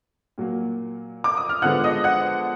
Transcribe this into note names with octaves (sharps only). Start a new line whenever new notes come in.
A#2 F#3 A#3
D6
D#6
F6
D3 F3 G#3 B3 F#5 F#6
D#5 D#6
F#5 F#6